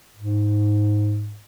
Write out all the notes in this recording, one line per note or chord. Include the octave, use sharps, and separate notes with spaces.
G#2